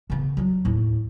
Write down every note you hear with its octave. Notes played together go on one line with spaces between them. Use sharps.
C#3 B3
F#3 G3
D#2 A2